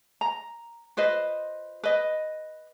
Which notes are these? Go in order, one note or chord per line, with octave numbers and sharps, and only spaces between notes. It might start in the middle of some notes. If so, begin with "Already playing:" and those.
A#5
F4 B4 C5 D#5
B4 D#5